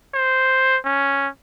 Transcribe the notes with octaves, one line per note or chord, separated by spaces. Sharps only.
C5
C#4